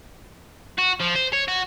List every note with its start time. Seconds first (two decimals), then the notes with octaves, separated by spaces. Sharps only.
0.79 F#4
1.01 F3
1.16 C5
1.33 C#5
1.48 F#4